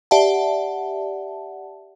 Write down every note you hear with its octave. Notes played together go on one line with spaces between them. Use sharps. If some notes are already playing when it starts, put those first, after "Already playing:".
G4 D5 E5 F#5 A5